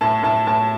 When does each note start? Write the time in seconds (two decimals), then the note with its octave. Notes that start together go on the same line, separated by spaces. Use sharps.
0.01 A2 A5
0.23 A2 A5
0.47 A2 A5